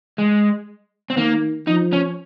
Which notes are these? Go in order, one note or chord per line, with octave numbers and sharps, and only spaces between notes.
G#3
C4
D#3 A#3
F3 D#4
C#4